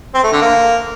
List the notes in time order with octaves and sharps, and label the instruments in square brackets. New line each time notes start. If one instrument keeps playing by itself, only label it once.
[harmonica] C4
A3
D3
A#3